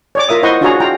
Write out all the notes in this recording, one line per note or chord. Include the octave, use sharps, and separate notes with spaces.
C#5 D5 D6
F4 A#4 E5 D#6
E4 C5 D#5 F#5 C6 C#6
D4 F4 F#4 G#4 C#5 A#5
F4 G5 A#5